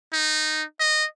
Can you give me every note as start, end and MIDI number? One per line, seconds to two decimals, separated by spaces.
0.13 0.63 63
0.80 1.05 75